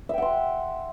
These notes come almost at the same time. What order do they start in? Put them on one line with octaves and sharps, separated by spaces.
E5 G5 F#5 C6